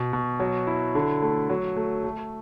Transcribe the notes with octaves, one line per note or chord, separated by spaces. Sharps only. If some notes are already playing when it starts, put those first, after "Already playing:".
Already playing: B2
B2
F#3
E4
D3
A3
F#3
A3
A3